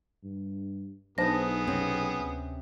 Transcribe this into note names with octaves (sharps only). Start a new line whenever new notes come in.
G2
B1 B3 D4 D#4 G#4 C5 A5 A#6
C3 C4 C#4
D2